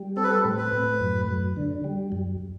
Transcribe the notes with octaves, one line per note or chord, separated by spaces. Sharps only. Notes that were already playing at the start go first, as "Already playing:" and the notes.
Already playing: G3
C4 A4
B4
A4
A2
B4
A2
F#2
F#2
D3
G3
F#2